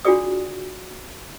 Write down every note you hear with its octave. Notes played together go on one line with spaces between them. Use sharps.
D4 F4 F#4 G#4 D5 D#6